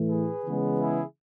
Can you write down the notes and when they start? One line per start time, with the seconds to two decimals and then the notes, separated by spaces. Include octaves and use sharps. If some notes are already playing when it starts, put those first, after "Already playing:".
Already playing: A2 E3 A3
0.10 G#4 B4
0.45 C#3 E3 G#3 B3
0.80 E4 G#4